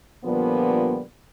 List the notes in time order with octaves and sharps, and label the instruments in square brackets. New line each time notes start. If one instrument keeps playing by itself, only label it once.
[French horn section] A#2 D3 F3 G3 B3